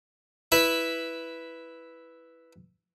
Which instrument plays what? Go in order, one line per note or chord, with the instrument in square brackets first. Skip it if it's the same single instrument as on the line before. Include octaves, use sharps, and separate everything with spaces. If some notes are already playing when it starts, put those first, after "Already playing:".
[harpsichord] E4 B4